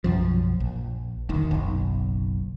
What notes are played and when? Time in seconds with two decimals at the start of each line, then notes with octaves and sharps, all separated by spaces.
0.04 B1 F#2 F3
0.60 A#1
1.29 E1 D2 D#3
1.51 F#1 B1